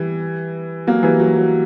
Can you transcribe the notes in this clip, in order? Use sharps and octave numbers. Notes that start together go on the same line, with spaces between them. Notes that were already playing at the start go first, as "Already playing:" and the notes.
Already playing: E3 G3
F#3 A#3
E3 G3
F#3
F#3